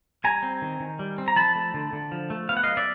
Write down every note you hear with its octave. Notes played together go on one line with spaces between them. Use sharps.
G3 G#5 A#5
C4
D#3
D#3
G3
C4
A#5
F3 A5 B5
A3
D3
D3
F3
A3
B3 F5
F#5
F#3 D#5 F5
D5 E5